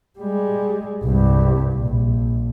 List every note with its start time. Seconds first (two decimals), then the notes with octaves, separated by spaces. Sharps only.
0.19 G3 G#3
1.03 C2 G2
1.74 A#1